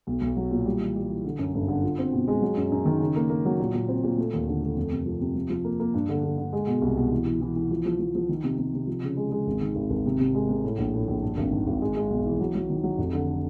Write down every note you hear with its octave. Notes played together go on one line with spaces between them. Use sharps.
B1
B1
F#3
A#2
G3
E3
G3
E3
D3
F#2
G1
D3
F4
C4
B2
G#3
F#3
F#2
F#2
D#3
C#3
A#3
A#3
F#3
A#2
A#2
C4
A#2
A3
D#2
D3
A3
F2
C3
F3
C3
F3
F3
A#3
A#3
G2
D3
D3
D3
G#3
B2
C2
B2
E3
E3
E3
E3
F3
F3
F3
F3
D#3
C3
C3
C3
F3
C#3
G#3
G#3
G#1
D#3
G#1
G#1
C3
C3
G#3
C3
A2
A#1
A2
A#1
G2
G#1
D#3
G#1
G#3
G#3
B1
E3
F#3
F#3
D#3
F#3
F1
D3